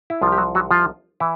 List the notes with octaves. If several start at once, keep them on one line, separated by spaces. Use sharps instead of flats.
E4
C2 C3 F3 F4
G4
F#3 F#4
F#3 F#4
F3 F4
E3 E4